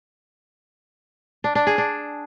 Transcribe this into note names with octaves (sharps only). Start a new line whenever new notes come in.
D4
D4
G#4
D4